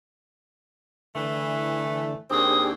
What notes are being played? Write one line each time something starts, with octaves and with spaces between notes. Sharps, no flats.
D3 E3 A3
D#2 C4 D4 G4 G#4 D#6